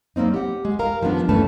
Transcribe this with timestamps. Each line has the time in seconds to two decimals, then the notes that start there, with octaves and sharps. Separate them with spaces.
0.16 F#3 G3 A#3 C4 D#4
0.34 G4 F#5
0.65 G#3
0.79 A#4 F5 A#5
1.01 D#3 F3 G#3 B3 D4
1.29 G2 E3 A3 C#4 B4 A5